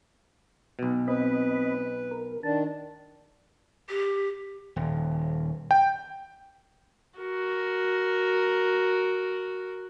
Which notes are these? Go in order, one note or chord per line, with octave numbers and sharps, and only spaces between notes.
B1 B2
C4 B4 D#5 B5
A#4
D#3 D4 A5
G4
D#1
G5
F#4 A#4